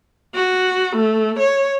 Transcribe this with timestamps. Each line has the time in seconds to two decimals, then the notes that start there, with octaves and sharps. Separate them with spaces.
0.35 F#4
0.96 A3
1.39 C#5